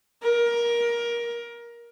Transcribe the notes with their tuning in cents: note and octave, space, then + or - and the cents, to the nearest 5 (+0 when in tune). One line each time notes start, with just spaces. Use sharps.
A#4 +20